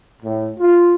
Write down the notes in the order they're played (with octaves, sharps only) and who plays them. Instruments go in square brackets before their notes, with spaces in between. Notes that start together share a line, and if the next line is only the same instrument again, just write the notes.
[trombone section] A2
F4